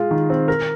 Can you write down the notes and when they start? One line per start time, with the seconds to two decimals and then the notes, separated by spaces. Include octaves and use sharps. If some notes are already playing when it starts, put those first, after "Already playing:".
Already playing: G#3 F4
0.11 D#3
0.30 C4
0.48 A#4